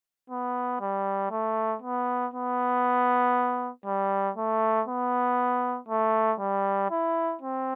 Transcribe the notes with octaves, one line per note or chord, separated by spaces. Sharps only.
B3
G3
A3
B3
B3
G3
A3
B3
A3
G3
E4
C4